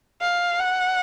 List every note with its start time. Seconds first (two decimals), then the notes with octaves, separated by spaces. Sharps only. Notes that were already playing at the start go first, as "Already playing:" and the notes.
0.21 F5
0.60 F#5